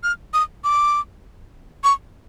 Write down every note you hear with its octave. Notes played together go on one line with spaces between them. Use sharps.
F6
D#6
D6
C#6